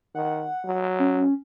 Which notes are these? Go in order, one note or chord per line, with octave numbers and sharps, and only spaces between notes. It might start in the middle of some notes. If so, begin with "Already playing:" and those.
D#3 F#5
F#3
C#4